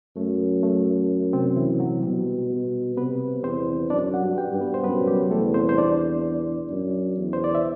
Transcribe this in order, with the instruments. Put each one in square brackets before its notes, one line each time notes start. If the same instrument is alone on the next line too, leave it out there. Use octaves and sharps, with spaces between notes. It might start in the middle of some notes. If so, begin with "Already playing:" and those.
[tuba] F#2 [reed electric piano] A3
[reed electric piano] A3
C3 C4
E3 E4
F#3 F#4
[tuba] B2 [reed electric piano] G3 G4
[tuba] B2
[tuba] C3 [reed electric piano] B3 B4
[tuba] E2 [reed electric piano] C4 C5
[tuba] F#2 [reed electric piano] D4 D5
[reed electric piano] F#4 F#5
[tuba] G2
[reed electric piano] G4 G5
[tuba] G2
[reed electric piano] B3 B4
C5
[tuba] F#2 [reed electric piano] B3 B4
[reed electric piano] G3 G4
[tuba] E2 [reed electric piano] A3 A4
[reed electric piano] C4 C5
C5
D4 D5
[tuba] F#2
E2
[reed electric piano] C5
D5
E5